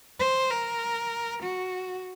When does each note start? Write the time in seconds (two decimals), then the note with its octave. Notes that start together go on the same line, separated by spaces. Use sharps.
0.19 C5
0.50 A#4
1.43 F#4